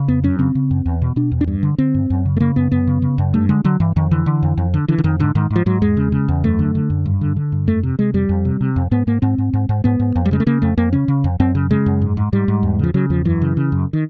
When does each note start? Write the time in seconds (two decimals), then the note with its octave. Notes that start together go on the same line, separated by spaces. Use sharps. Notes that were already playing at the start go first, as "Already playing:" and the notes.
Already playing: C#3
0.08 F2 B3
0.24 F#2 C#4
0.39 C#3 C4
0.55 C#3
0.71 F#2
0.86 E2
1.02 B2
1.16 B2 D4
1.32 E2
1.41 D4
1.48 G2
1.63 D3
1.78 D3 C4
1.95 G2
2.10 F#2
2.26 C#3
2.37 A3
2.40 C#3 A#3
2.56 F#2 B3
2.71 F#2 B3
2.87 C#3
3.02 C#3
3.18 F#2
3.34 G2 A3
3.49 D3 G#3
3.64 D3 F#3
3.80 G2 E3
3.96 F2 D#3
4.11 D3 E3
4.26 D3
4.43 F2
4.57 F2
4.74 D3
4.88 D3 E3
4.98 D3
5.04 F2 D#3
5.19 G#2 D3
5.35 G#2 D#3
5.50 G#2
5.56 F3
5.66 G#2 F#3
5.82 E2 G#3
5.97 C#3
6.12 C#3
6.28 E2
6.44 F#2 A3
6.59 D3
6.75 D3
6.90 F#2
7.06 G2
7.21 D3
7.36 D3
7.52 G2
7.67 F2 A3
7.83 C3
7.99 C3 G#3
8.14 F2 G3
8.29 F2
8.45 C3
8.61 C3
8.76 F2
8.91 G#2 B3
9.07 G#2 A#3
9.22 G#2 C4
9.38 G#2
9.53 G#2
9.69 G#2
9.84 G#2 B3
10.00 G#2
10.16 F2
10.26 G3
10.31 C#3 G#3
10.40 A3
10.47 C#3 A#3
10.62 F2 A3
10.78 F2 A#3
10.93 C#3 C#4
11.08 C#3
11.24 F2
11.40 F#2 C4
11.55 C#3
11.70 C#3 G#3
11.86 F#2
12.01 G#2
12.17 G#2
12.33 G#2 G3
12.48 G#2
12.63 E2
12.79 C#3 F3
12.94 C#3 F#3
13.10 E2 F3
13.25 F#2 E3
13.42 C#3
13.57 C#3
13.72 F#2
13.93 D#3